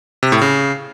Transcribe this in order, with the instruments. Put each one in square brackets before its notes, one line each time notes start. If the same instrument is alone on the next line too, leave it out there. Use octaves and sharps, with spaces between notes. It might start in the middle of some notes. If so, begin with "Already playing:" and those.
[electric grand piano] C3
A2
C#3